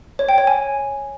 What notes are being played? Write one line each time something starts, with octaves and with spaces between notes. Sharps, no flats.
C#5
G5
C#5
G#5